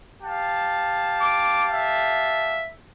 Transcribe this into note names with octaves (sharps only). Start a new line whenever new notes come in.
G4 F5 A5
D6
E5